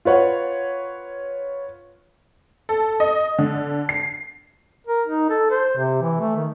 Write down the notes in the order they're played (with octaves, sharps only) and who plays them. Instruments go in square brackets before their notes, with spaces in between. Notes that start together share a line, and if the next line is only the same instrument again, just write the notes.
[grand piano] F4 B4 C#5 F#5
[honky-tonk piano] A4
D#5
D3
C7
[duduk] A#4
D#4
A4
C5
C3
E3
A3
D#3